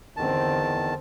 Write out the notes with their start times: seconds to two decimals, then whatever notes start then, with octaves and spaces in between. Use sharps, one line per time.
0.17 E2 D3 D#3 C4 A5